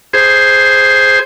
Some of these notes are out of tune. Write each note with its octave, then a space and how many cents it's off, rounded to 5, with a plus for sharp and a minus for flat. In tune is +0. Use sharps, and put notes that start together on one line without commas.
G#4 +0 C5 +0